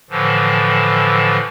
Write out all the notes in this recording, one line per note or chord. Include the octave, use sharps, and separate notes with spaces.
A2 D3 E3 F3